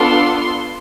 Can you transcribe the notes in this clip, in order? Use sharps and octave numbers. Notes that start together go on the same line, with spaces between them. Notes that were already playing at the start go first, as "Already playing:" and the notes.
Already playing: B3 D4 F4 A4 C6